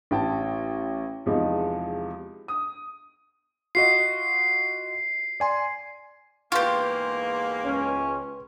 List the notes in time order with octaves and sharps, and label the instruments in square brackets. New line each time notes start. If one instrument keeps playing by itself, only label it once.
[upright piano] A1 G5 A5
E2 C3 F3 G#3 D#4
D#6
[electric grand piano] F4 F#4 D#5 [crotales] C7
[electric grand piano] D5 G#5 C6
[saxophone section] E2 G#2 A#3 [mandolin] F4 G4 [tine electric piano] B4 C6 C#6
[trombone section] C#2 C#4